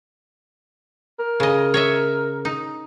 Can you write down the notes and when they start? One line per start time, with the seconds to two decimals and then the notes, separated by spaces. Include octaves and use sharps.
1.20 A#4
1.40 C#3 D#5
1.74 C#5 D#5 E5
2.45 D#4